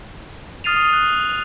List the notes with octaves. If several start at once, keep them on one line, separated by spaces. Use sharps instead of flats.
D#6 F6 A6 C7 D#7 F7
D#6
F#6